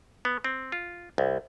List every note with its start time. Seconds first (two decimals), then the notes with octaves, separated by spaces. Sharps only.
0.25 B3
0.44 C4
0.72 F4
1.18 C2